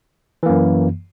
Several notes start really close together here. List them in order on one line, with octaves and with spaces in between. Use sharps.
E3 A#3 F#2